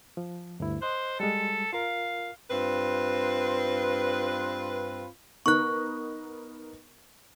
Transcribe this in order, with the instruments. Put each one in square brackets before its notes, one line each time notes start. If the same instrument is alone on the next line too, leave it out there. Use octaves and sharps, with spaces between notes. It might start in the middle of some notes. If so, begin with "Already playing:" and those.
[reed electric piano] F3
D2 G2 E4
[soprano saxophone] C5 [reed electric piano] D#5 C6 F#6
[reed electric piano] G3 G#3 [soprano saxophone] A4
[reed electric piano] F4 A#4 [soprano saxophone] F5
[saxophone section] G2 C4 F4 B4
[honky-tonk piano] B3 D#4 A#4 [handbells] C#6 F#6